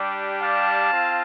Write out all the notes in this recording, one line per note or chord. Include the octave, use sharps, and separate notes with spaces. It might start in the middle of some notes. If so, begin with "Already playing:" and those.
Already playing: G3 D4 G4
F5 A5
C4 F4